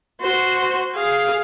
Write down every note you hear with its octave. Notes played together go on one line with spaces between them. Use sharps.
F#4 C5
G#4 F5